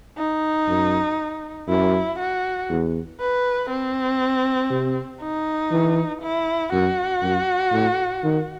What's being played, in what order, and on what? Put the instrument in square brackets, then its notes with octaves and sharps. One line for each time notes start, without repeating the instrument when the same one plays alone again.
[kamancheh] D#4
[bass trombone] F#2
[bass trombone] F#2 [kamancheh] E4
[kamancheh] F#4
[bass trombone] E2
[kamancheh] B4
C4
[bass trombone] C3
[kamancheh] D#4
[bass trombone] E3
[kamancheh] E4
[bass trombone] F#2 [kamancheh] F#4
[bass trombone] F#2
A2
D#3